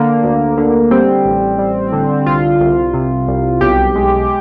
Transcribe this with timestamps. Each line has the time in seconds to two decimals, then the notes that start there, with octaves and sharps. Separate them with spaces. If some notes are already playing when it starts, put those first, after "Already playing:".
Already playing: D3 A#3
0.24 D2
0.58 D3
0.91 G3 C4
1.25 A1
1.58 G3
1.92 D3
2.26 C2 F4
2.60 C2
2.94 C3
3.27 C2
3.61 B1 G4
3.95 G#3